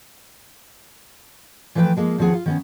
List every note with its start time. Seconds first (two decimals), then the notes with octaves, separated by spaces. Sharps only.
1.75 E3 F3 A3 B4 G5
1.97 F3 G#3 A#3
2.18 D#2 D#3 F3 C4 G#4 F#5
2.34 F4
2.46 D#3 B3 C#4